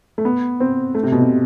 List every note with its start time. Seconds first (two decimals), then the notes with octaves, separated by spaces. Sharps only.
0.18 A3
0.25 B3
0.60 C4
0.95 A3
1.03 C3
1.12 B2
1.21 C3